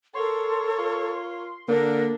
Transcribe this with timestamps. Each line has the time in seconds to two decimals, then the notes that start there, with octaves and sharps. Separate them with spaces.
0.15 A4 A#4 C#5 C6
0.79 F4
1.68 D3 A#3 D4 A#4